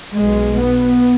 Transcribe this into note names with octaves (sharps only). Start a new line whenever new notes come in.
B1 B2 G#3
B3